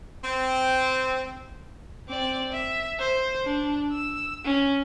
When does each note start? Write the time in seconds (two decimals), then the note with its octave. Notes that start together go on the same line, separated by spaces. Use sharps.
0.24 C4
2.08 C4 D5
2.52 E5
2.99 C5
3.45 D4
3.92 E6
4.45 C#4